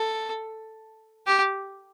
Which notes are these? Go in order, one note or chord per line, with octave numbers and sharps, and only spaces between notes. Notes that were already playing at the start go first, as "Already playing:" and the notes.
Already playing: A4
G4